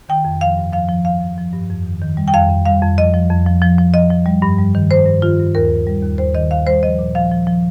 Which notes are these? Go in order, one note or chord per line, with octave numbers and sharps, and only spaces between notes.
D#3 G5
F2
F3 F5
G2
F3 F5
F3
F3 F5
F3
F3
G2
F2
D#3
D#3
G3
G5
F2 F5
F2
G3 F5
F2
F3 D#5
F3
F2
F3
F3
F3
F3 D#5
F3
G3
G2
G3
D#3
G2 C5
G2
D#3 F4
G2
D#2 A#4
D#2
G3
D#2
D#2 C5
D#3 D#5
D#2 F5
G3 C5
F3 D#5
A#2
F3 F5
F3
F3